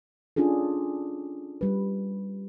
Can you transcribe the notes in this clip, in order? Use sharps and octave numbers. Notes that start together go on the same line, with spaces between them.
C#4 D4 F4 G#4 A4
G3 B4